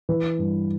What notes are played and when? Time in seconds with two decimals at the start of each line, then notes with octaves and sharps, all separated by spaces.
0.09 E3 B4
0.39 G2